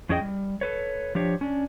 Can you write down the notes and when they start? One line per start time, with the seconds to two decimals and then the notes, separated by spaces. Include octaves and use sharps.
0.09 F2 C#4 E4 G#4 D#5 G5
0.21 G3
0.61 A4 B4 C#5
1.15 F3 D4 G4 C#5
1.41 C#4 D4